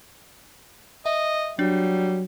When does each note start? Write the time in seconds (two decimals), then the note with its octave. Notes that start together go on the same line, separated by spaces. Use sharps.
1.06 D#5 E5
1.59 F#3 G3 D4